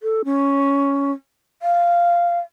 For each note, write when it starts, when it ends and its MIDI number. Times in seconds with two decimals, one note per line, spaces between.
0.03 0.22 69
0.25 1.11 61
1.62 2.39 77